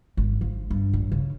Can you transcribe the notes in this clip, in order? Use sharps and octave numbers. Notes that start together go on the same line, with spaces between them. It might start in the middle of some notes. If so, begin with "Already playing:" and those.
G#1
F3
G2
A1
C#3